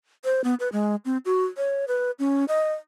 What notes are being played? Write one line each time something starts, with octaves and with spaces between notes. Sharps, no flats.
C5
B3
B4
G#3
C4
F#4
C#5
B4
C#4
D#5